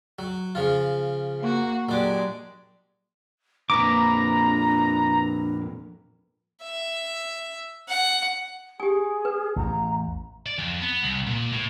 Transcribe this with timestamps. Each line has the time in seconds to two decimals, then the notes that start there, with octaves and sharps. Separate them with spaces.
0.19 F#3
0.55 C#3 F3 F4
1.41 A#3 F#4
1.89 A#2 F#3 G#3 D4 G4
3.70 F2 A#2 A#3 D4 B4 A#5 D6
6.63 E5
7.89 F#5
8.80 G4 G#4 G#5
9.25 B4
9.56 A1 E2 A#5
10.46 D5
10.59 F2
10.81 B3
11.03 C2
11.27 A#2
11.52 A2